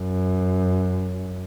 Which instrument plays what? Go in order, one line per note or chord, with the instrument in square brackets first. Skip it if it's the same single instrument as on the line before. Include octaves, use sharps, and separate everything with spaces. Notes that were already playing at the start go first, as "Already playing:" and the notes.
Already playing: [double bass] F#2